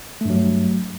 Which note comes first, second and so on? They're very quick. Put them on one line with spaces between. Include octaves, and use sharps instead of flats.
A3 G2 F#3